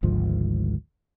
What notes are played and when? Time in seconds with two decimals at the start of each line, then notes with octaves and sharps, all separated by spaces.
0.03 G#1 D2 G#2 F3